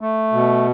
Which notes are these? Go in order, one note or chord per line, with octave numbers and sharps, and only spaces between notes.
A3
B2